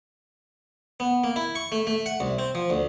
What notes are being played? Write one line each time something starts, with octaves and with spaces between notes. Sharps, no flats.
B3
A#3
E4
C#6
A3
A3
F#5
C2
C4
F3
D2